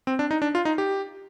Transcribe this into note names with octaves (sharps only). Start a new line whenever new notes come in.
C4
D4
D#4
D4
F4
D#4
G4